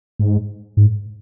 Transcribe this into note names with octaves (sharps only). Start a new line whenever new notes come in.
G#2
G#2